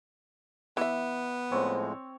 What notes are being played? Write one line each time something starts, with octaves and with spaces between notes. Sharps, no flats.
E3 B3 E5
A2 F3 G#3 C4 C#5